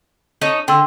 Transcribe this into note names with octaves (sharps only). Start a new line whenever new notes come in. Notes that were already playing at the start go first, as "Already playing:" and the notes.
C#4 D#4 A4
D3 G5 C6 E6